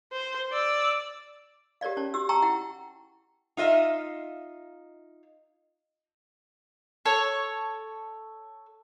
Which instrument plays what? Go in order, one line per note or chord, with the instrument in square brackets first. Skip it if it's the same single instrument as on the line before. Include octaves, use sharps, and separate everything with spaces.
[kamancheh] C5
D5 E6
[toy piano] G4 A#4 C#5 D5 F5
C#4 C#5 A5
F#4 G4 E6
G4 G5 A5 A#5 C#6 E6
E4 F#5 G5
[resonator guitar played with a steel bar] D#4 F4 D#5 E5
[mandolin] A4 C#5